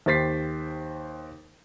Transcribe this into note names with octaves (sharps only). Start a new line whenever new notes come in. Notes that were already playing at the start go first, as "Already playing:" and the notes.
D#2 G4 C5 A6 B6 C7